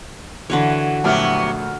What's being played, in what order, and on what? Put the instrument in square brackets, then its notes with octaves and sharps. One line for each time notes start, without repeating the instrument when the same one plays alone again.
[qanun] D3 B4 C#5 [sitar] E3 [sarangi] F#4
[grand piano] A#1 A3 F6 [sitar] F#3 B3 G4